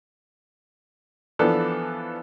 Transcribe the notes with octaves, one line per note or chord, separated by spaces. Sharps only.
E3 F3 B3 D4 A4 D5